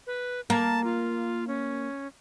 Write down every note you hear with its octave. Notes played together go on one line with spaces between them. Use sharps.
B4
A#3 A5
F4
C#4